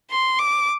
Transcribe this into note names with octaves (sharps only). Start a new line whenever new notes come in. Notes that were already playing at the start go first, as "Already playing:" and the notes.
C6
D6